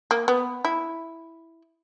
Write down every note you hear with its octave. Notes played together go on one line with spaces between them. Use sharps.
A#3
B3
E4